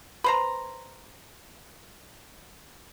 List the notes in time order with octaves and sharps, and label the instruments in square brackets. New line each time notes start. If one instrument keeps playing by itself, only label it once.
[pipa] B4 C5 A#5